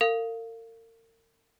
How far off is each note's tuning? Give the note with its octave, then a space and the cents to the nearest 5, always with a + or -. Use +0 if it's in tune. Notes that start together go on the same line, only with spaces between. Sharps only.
A#4 -45 F5 +0